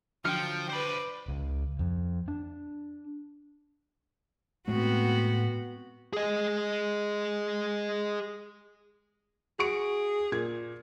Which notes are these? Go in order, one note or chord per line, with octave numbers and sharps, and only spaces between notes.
D3 F3 F#3 G5 F6 C#7
B4 C5 D5 B5
C#2
F2
D4
A2 G#3 A3 B3 C4 F#4
G#4 D#5
F#4 G#4 C#6 D7
A#2 G#6